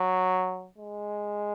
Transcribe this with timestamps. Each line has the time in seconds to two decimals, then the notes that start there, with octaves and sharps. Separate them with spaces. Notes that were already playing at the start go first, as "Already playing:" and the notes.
Already playing: F#3
0.78 G#3